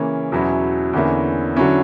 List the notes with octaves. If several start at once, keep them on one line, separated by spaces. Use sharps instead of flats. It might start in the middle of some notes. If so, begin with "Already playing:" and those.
Already playing: C#3 E3 A#3 C#4
E2 B2 F#3 C#4 E4
E2 D3 A#3 C#4 E4
D3 F#3 C#4 E4